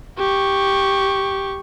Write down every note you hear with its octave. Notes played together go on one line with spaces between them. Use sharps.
G4 C#6